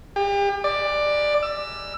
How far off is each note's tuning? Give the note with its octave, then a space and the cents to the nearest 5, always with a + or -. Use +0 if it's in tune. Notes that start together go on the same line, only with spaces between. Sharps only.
G4 +40
D5 +10
E6 +25